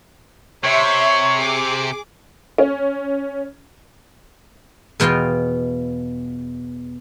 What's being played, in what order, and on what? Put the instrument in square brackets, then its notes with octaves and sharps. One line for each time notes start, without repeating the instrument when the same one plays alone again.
[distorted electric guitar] C3 [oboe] C#5 [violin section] E5 C6
[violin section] G#4 D6
[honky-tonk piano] C#4
[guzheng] E2 B2 F4 D#5 G5